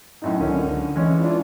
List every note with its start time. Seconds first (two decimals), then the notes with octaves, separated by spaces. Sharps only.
0.22 F#2 A2 D#4
0.40 C#2 F#2 D3 D#3 C#4
0.96 E3 G#3 C#4
1.20 D4 F4